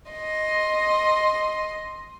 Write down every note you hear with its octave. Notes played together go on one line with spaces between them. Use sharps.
D#5 C6